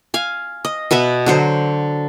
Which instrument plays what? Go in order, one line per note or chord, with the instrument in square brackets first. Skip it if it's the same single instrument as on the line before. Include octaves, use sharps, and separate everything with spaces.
[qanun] F5 G#5
D#5
B2 B3 B4 E5
D3 F#3 C5